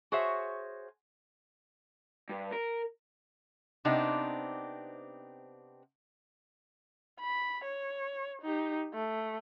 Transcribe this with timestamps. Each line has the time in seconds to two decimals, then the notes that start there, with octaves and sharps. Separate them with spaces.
0.12 F#4 G#4 C5 C#5 E5
2.29 G2
2.52 A#4
3.85 C3 B3 C4 D4 D#4
7.20 B5
7.64 C#5
8.42 D#4 G4
8.94 A3